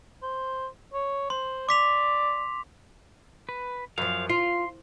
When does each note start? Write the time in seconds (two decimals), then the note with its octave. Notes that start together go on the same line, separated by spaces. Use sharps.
0.22 C5
0.93 C#5
1.30 C5 C6
1.69 D5 D6 B6 F7
3.49 B4
3.98 F#2 F3 F5
4.30 F4 C6